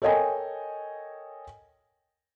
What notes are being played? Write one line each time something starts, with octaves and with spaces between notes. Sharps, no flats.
A4 A#4 C#5 D#5 G5 G#5